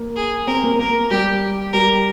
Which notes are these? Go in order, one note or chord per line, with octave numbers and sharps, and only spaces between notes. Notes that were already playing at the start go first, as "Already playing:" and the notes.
Already playing: A#3
G#4
C4 A#4
A#3
A#3 A#4
G3 G4
G3 A#4